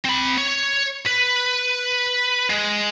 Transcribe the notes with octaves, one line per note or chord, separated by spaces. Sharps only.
C4 B5
C#5
B4
G#3